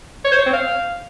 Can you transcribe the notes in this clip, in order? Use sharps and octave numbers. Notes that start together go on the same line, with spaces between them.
C#5
C5
C#5
C4
F5